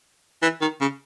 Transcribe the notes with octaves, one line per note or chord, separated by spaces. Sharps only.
E3
D#3
C#3